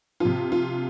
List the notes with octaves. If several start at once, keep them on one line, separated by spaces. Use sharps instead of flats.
C3 F3 F4
F4